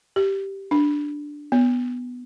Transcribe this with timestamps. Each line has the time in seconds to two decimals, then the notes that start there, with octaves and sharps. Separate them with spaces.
0.16 G4
0.71 D4
1.52 B3